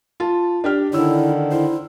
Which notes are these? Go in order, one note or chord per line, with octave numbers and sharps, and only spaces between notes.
F4 A5
D4 G4 F6
D3 D#3 E4 C#5 E6
E4 C5